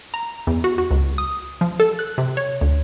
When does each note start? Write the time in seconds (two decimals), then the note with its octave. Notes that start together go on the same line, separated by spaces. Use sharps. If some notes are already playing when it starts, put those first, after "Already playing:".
0.14 A#5
0.47 E2
0.64 F#4
0.78 F#4
0.91 C#2
1.18 D#6
1.61 F3
1.80 A4
1.99 F#6
2.18 C3
2.37 C#5
2.61 D2